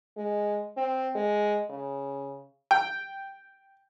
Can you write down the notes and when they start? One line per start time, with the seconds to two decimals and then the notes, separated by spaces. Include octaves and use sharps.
0.17 G#3
0.77 C4
1.15 G#3
1.70 C#3
2.71 G5